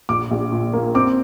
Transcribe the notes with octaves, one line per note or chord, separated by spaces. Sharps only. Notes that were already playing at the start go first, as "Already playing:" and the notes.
A#1 D6
A#1
A#2
A#3
C4 D6